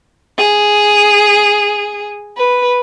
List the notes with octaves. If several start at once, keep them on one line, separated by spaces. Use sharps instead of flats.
G#4
B4